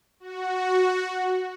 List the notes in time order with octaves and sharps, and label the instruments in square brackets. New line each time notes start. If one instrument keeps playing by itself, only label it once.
[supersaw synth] F#4